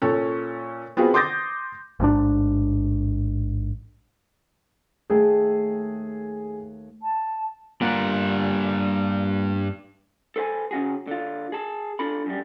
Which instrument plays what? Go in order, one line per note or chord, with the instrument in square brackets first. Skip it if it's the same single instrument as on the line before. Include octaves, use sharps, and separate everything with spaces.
[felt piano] A#2 C#4 A4
B3 C4 F4 F#4 G#4
C6 D6 D#6 G6 A6 A#6
[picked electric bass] A1 G#2 C3 D4
[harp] D#2 A3 G5 [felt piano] G#4
[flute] A5
[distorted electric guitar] G2 F#5 [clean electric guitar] A#2
[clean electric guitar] A4 B4 C5 G5 G#5
C#3 C#4 F#4 G#4
D3 F4
G#4 A5
D4 F4 A4 B5
F#2 G3